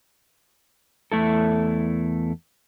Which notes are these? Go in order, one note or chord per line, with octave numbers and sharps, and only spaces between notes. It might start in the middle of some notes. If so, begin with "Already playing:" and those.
E2 A3 E4 A4